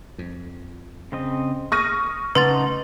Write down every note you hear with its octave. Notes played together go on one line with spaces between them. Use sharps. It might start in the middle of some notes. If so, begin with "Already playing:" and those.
F2
C#3 C4 D#5
C#6 D#6 F6 A#6 D#7
C#3 A3 D#4 B4 F#5 A5 C6 A6